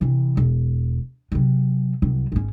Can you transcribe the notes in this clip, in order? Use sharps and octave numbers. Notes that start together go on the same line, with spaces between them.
C3 E3
E1
C3 F#3
C2 F#3
G#1 C#4